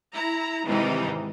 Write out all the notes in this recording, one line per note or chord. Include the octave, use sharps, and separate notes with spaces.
E4 A#5
G#2 C3 D#3 E3 G3 D#4